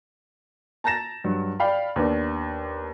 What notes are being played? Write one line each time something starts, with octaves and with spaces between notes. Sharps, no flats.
A5 A#5 A6 A#6 E7
G2 F#3
D5 F5 G5 B5
D#2 B3 D4